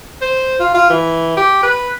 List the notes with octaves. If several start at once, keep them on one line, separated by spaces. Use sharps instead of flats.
C5
F4
F4
E3
G4
B4